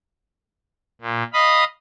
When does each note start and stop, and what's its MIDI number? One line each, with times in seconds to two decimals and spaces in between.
1.01 1.23 46
1.33 1.64 75
1.33 1.64 77
1.33 1.64 83
1.33 1.64 87